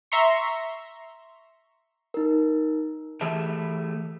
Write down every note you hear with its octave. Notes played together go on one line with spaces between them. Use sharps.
E5 A#5 C6 C#6
D#4 A#4
E3 A3 G4 G#4 E5 A5